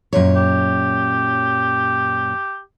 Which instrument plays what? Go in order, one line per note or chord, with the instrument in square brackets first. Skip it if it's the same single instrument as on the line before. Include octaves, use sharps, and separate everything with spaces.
[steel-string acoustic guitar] F#2 A#2 C#5
[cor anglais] G4